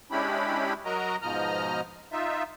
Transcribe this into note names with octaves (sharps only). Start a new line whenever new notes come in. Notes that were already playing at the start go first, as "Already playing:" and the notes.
G#3 C#4 D4 E4 G4 B5
F#3 F#4 A#4 D#5 A#5
G#2 B2 F3 D#5 A#5 F6
D#4 F4 E5